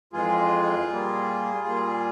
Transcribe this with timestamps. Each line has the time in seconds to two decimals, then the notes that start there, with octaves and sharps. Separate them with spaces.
0.13 F2 E3 G#3 F4 G#4
0.90 A#2 G3 A#3
1.67 A#2 G3 A#3